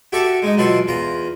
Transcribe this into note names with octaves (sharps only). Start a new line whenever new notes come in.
F#4 G4 A4 E5 C#6 D6
G#3 D#4
B2 E3 F#3 F4 A4 C6
E2 F4 A#5